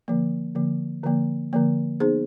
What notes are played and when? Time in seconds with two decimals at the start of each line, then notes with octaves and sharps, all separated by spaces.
0.08 D3 F3 A#3
0.55 D3 F3 A#3
1.04 D3 F3 A#3
1.53 D3 F3 A#3
2.00 B3 D#4 G#4 C5